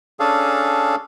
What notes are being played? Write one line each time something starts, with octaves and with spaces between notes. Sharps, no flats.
C#4 D4 G#4 A4 F5